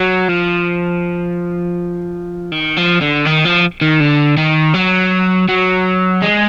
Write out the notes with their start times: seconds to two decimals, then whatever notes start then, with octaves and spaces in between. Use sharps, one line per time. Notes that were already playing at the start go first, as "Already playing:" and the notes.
Already playing: F#3
0.29 F3
2.52 D#3
2.77 F3
3.01 D3
3.25 D#3
3.45 F3
3.81 D#3
4.00 D3
4.37 D#3
4.74 F#3
5.48 F#3
6.22 G#3